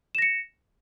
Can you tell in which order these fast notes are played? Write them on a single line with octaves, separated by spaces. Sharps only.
E7 A#6 C#7